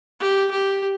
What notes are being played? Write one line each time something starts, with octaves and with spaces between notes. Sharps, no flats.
G4
G4